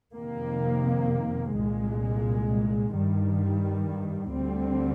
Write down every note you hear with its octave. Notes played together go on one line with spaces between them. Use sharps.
F2 C3 D#3 A#3
C2 A#2 G#3
G2 D#3 G3
D2 D3 G3 C4